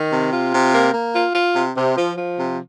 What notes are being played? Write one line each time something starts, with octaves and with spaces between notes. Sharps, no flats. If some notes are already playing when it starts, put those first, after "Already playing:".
Already playing: D#3
C3
F4
C3
A#3
A#3
F4
F4
C3
C3
F3
F3
C3